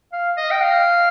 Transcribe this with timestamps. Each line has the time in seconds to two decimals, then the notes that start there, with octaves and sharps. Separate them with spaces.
0.13 F5
0.37 D#5
0.51 G5
0.61 F5